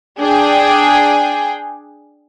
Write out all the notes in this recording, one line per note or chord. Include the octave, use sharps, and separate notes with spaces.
D4 G#4 G5